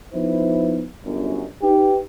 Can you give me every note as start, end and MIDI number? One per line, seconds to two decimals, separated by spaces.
0.14 0.84 53
0.14 0.84 59
0.14 0.84 63
0.14 0.84 64
0.14 0.84 71
0.14 0.84 72
1.04 1.45 31
1.04 1.45 42
1.62 1.99 63
1.62 1.99 67
1.62 1.99 71